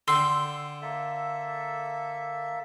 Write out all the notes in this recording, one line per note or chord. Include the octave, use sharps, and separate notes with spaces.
D3 G5 C6 E6 C7
A#3 A4 E5